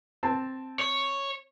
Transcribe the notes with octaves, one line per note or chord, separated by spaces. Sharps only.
C4 A5
C#5